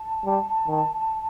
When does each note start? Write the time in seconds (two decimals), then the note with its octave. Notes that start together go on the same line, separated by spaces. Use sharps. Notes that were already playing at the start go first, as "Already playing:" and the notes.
Already playing: A5
0.25 G3
0.68 D#3